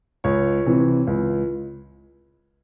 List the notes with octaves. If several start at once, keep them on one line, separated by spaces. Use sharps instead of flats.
C#2 C#5
C3 E3
C#2